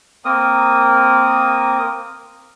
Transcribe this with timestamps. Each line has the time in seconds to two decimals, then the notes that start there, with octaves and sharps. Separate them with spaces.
0.25 A#3 C4 A#4 D#6